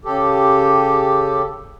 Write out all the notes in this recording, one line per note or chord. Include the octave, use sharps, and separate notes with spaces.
C#3 G4 A4